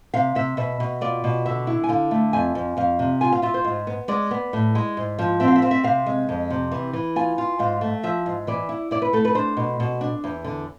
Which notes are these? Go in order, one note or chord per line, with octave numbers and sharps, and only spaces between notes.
C3 F5
C3 E5
B2 E5
B2
F4 D5
B2
D3 E5
E4
G#5
D3 F5
A3
F2 G#5
F2
F2 F5
C3
F4 G#5
F5
F4 E5
C5
G#2
B3
G#3 D5
B3
A2
G#3
G#2
F3
C4 E5
F5
E5
C4 F5
E5
C3 F5
G#3
F2
C3
E3
E3
F4 G#5
F4
G#2 F5
A3
F3 E5
G#2
E3 D5
E4
E4 D5
B4
A3 A4
B4
D4 C5
B2
B2
D4
E2
D3